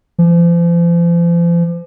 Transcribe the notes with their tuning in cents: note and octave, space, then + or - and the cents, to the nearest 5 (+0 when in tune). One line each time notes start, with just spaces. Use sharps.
F3 -40